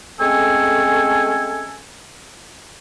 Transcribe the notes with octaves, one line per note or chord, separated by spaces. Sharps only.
G#3 A3 C4 C#4 A4 G#5